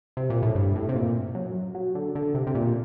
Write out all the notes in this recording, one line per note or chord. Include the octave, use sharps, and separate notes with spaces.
C3
A#2
A2
G2
A2
C3
A#2
F#2
F#3
D3
D3
C3
C3
A#2